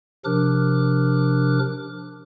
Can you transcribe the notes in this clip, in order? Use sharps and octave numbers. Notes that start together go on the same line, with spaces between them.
C3 F3 D4 A#4 D6 F#6